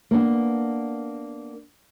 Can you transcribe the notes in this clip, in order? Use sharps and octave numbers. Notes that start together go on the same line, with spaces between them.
A#3 B3 D4